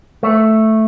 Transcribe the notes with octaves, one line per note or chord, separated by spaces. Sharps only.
A3